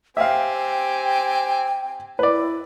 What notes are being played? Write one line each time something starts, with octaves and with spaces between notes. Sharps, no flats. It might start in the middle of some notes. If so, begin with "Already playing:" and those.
C4 G4 E5 F5 G5 G#5
E4 B4 D5